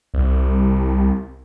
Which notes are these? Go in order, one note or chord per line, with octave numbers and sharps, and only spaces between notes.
C2